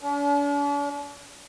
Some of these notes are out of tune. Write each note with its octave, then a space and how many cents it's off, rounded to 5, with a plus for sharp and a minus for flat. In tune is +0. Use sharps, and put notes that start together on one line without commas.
D4 -45